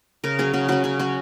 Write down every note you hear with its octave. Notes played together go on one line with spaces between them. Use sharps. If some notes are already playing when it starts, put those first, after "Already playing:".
C#3 A#4
F#3 C#4 G#4
C#3 F#4
F#3 C#4 F#4
C#3 F#4
F#3 C#4 F#4